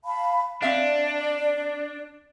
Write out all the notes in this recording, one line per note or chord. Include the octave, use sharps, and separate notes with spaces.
F5 A5 B5
C4 D4 D5 E5 F5